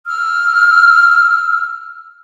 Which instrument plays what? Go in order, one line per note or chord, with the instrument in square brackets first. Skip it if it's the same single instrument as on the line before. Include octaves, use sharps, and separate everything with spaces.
[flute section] E6 F6